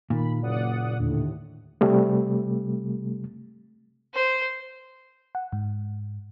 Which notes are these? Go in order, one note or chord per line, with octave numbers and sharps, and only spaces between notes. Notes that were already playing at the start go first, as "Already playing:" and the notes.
A#2 D#3 B5
F#1 D5 F#5 D#6
D#2 A2 D3
C3 G3 A3
C5
F#5
G#2